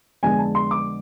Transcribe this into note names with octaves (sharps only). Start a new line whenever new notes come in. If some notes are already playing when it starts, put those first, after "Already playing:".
F2 D3 G#3 B3 D4 G#5
A5
C6
D6